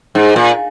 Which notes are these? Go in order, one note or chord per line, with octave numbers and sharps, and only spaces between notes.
G#2
A#2